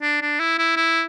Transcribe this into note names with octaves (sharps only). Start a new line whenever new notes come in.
D4
D4
E4
E4
E4